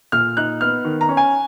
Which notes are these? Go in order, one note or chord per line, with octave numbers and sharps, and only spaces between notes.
A#2 F6
D#4 F#6
B3 F6
D#3
A#5
C#4
G#5